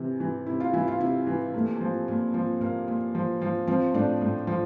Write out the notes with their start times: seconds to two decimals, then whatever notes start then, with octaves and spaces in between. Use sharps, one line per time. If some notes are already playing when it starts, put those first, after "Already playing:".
Already playing: C3 E3
0.20 E3
0.46 C3 E4
0.60 F4
0.73 E3 E4
0.88 F4
1.00 C3 E4
1.27 E3
1.53 A#2 A3
1.81 F3
2.08 A#2
2.34 F3
2.60 A#2 A#3
2.88 A#2
3.15 F3
3.41 F3
3.67 F3 C4
3.94 A2 D4
4.21 A2
4.47 F3